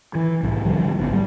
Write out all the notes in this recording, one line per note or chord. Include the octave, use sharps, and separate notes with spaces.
E3
C2 A2
D#1 D3 F3 G3
D1 G#1 B3
G3